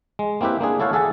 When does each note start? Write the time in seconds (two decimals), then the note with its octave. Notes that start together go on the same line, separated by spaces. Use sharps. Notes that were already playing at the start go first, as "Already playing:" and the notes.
0.19 G#3
0.41 A#3 C4 E4 G4 B4
0.61 A#3 D4 G#4
0.80 E4 A4 C#5 F5 F#5
0.93 G#4 A4 E5 F#5 G#5 A5